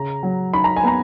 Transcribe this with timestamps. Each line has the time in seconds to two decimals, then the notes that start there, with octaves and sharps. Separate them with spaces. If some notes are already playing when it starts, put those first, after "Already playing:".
Already playing: C#3 A#5
0.23 F#3
0.53 D#4 B5
0.64 A#5
0.76 G#5
0.84 B3 A#5